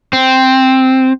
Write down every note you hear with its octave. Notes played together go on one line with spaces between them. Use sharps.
C4